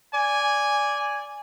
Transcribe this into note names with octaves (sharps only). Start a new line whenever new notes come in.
D5 G#5